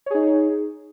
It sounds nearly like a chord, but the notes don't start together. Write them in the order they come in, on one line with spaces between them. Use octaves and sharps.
C#5 G#4 D#4